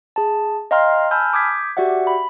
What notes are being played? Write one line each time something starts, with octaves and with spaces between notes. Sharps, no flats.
G#4 A5
D#5 F5 G5 A#5 C6 F6
G#5 A5 B5 E6 F6 G6
D6 D#6 G6 G#6 B6
F#4 G4 D5 E5 F#5
B5